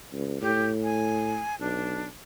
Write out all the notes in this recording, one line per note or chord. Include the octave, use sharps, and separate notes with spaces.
C#2
A2 G4
G#5
B1 D4